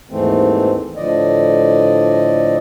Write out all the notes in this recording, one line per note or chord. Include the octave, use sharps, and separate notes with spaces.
D#2 G#2 E3 A3 C4
A2 D3 F3 D5 D#5